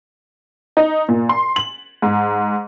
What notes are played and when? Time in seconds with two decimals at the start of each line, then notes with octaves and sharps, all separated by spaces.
0.77 D#4
1.09 A#2
1.29 C6
1.56 F#7
2.02 G#2